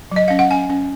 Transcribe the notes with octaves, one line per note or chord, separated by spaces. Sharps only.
F#3 D#5
C#4 F5
F#5
C#4 G#5
C#4